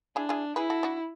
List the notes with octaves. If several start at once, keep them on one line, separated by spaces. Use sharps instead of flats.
D4 E4 G#4
E4 G#4
E4 G#4 B4
F#4 A4
D4 F#4